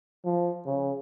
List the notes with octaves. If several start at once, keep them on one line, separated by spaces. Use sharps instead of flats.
F3
C#3